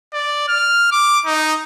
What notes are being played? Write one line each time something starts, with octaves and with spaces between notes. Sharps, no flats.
D5
F6
D6
D#4